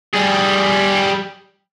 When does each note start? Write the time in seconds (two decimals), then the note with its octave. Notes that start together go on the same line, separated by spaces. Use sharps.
0.13 G3 G#4